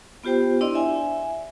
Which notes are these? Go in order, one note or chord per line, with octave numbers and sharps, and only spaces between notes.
B3 F4 G4 C5 G5
D4 E4 D5 D#5 C6
E5 G#5